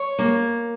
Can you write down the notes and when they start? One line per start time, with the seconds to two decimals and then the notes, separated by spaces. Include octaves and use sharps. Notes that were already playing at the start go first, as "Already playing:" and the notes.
Already playing: C#5
0.19 A#3